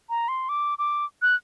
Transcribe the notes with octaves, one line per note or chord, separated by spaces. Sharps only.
A#5
C6
D6
D6
F#6